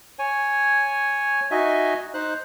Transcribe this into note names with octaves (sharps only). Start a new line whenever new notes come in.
C#5 G#5
D#4 F#4 D#5 E5 G#5
D#4 C5 F#6